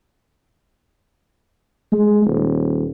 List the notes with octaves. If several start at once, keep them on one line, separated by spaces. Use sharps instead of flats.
G#3
D#1